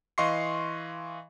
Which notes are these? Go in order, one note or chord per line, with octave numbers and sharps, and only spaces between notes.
E3 D#5 F5 C6 C#6 C7